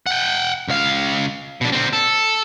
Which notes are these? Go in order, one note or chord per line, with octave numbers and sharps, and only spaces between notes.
F#5 G5
C#2 F5
B2 D4
D3 C4
A4